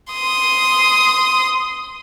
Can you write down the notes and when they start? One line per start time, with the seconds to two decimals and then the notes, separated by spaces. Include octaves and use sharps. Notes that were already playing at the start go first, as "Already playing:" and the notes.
0.13 C6 D#6